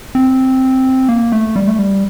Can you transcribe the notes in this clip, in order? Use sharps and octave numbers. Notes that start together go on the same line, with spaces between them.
C4
A#3
A3
G3
A3
G3